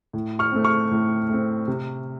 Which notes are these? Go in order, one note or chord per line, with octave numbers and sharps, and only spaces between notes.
A2
C#6 F6
A3 C4
C#6 F6
A2
A3 C4
C3